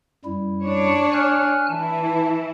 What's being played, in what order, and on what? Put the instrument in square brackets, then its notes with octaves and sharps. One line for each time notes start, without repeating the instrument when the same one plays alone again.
[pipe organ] F#2 G3 E4
[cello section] D4 C#5
[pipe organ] G#5 F6 F#6
[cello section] E3 E4 [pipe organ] A5